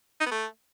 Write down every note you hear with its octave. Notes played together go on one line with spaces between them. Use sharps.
D#4
B3
A3